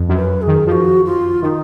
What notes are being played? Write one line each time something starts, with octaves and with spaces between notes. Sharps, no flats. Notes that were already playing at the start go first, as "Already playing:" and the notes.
Already playing: F2
F#2
B4
G#4
D#3
F3 F#4 G#4
F4
D#3 D#4